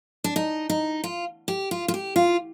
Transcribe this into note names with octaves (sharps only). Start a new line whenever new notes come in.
D4
D#4
D#4
F4
G4
F4
F4
G4
F4